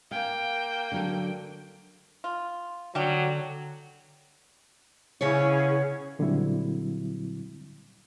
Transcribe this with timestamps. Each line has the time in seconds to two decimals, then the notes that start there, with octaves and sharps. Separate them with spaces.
0.11 A#3 F5 G5 G#5
0.92 D3 F#3 A4
2.24 F4
2.95 D3 F#3 G3 D4 G4
5.21 C#3 B3 C#4 E4 G#4 C#5
6.19 A#2 D3 F#3 G3 C4 E4